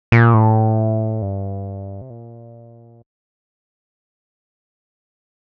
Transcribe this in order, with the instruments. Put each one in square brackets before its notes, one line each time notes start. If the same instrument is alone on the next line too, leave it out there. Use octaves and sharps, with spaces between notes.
[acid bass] A#2
A2
G2
C3
A#2